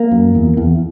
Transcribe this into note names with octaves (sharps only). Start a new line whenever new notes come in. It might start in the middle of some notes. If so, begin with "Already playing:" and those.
Already playing: A#3
F#2
E2
E2